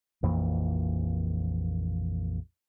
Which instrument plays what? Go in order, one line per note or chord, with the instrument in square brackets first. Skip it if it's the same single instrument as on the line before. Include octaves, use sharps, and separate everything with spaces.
[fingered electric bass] A#1 F2 E3 A#3